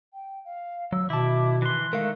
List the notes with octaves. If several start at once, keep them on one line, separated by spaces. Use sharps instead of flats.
G5
F5
F#3 E6
B2 D#3 E4 A5 D6
E3 C6 F#6
D#3 G#3 A3 A#4 F5